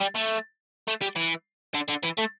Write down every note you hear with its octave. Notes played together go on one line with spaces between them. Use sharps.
G3
A3
A3
G3
E3
D3
D3
E3
A3